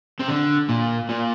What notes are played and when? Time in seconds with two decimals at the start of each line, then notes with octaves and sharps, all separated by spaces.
0.19 C3
0.28 D3
0.69 A#2
1.09 A#2